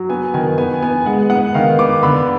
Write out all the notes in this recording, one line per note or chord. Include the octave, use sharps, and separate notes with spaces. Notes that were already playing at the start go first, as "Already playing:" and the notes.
Already playing: F#3
B3 G#5
D#3 G#5
B3 G#5
B3 G#5
G#3 F#5
B3 F#5
D#3 F5
B3 D6
D3 B5